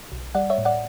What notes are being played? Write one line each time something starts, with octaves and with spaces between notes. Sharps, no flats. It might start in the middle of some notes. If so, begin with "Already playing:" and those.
B1
G3 D5 F#5
C#5 E5
A2
D5 F#5